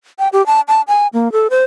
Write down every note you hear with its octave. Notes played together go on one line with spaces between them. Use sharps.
G5
G4
A5
A5
G#5
A#3
A4
C5